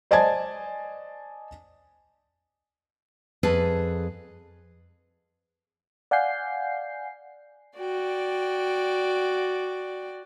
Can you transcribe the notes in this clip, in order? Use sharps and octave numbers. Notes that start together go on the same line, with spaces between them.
C5 D5 D#5 G#5 A5 G#6
F2 G#4 A4 B4 A5
D5 F5 F#5 G#5 G6 C7
F#4 D5 G5